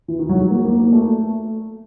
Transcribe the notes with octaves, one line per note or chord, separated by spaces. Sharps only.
E3
D#3
F#3
G#3
A#3
A#3
A#3
A3